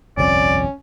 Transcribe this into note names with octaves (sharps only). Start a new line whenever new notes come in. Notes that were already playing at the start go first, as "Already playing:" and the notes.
G1 C2 F2 C#4 D5